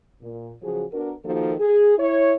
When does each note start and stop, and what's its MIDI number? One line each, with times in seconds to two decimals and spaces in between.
0.22 0.52 46
0.62 0.84 49
0.62 0.84 53
0.62 0.84 54
0.62 0.84 66
0.62 0.84 68
0.92 1.14 59
0.92 1.14 62
0.92 1.14 66
0.92 1.14 70
1.24 1.54 51
1.24 1.54 53
1.24 1.54 58
1.24 1.54 63
1.24 1.54 66
1.24 1.54 69
1.60 1.94 68
1.98 2.35 64
1.98 2.35 73